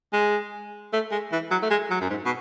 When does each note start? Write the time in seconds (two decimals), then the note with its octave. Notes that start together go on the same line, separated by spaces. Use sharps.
0.13 G#3
0.93 A3
1.11 G#3
1.32 E3
1.51 F#3
1.62 A3
1.70 G#3
1.91 F#3
2.01 F#2
2.10 G#2
2.26 B2